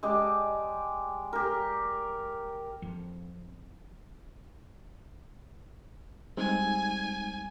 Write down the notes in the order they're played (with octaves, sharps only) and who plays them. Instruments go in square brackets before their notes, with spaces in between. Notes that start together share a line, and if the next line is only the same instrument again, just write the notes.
[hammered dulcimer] G#3 G4 D5 A5
G4 A#4
[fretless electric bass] F2
[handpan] G3 [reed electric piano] G#3 C4 D#4 [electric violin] G#5